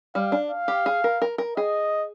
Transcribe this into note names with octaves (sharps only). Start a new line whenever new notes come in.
G3 F5
D4
F5
G4
G#4
A#4
A#4
A#4
G#4 D#5